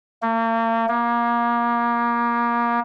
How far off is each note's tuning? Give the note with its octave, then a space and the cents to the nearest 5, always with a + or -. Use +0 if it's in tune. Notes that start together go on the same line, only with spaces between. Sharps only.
A#3 -40
A#3 +25